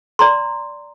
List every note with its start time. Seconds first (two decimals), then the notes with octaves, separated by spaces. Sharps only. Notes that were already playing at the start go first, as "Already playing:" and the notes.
0.19 D5 A#5 C6